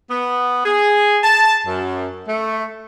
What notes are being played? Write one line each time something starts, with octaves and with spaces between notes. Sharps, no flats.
B3
G#4
A5
F#2
A3